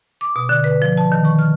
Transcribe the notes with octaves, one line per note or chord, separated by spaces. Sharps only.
D6
B2
D3
B4
F3
A5
D#3
C#6
F6